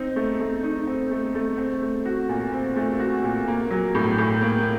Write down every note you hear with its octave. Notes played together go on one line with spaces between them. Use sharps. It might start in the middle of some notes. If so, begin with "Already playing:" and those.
Already playing: C4 D#4
A3
A3
D#4
C4
A3
A3
C4
A3
F#4
A#2
C4
A3
F#4
A#2
A#3
F#3
A2
A2
A#3